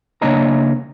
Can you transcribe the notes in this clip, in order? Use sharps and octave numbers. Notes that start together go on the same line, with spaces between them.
C#3 A#3 D4 C#5 D#5 A#5